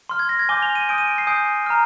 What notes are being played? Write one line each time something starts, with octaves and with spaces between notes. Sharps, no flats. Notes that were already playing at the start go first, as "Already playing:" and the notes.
C6 F6
G#6
A#6
G#6
G#5 D6 G6 G7
F7
D#7
G#5 D#6 G6 D7
D#7
D7
C7
G#5 D#6 G6 D7
A#5 F6